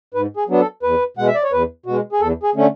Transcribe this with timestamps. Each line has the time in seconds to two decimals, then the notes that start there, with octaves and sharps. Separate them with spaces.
0.14 G#2 B4
0.37 G#4
0.48 F#3 B3 D4
0.60 A4
0.83 E2 B4
1.17 B2 G#3 F#5
1.27 E5
1.35 D5
1.43 C#5
1.52 E2 B4
1.86 B2 G#3 F#4
2.13 G#4
2.20 E2 A4
2.43 G#4
2.55 D3 A3 C#4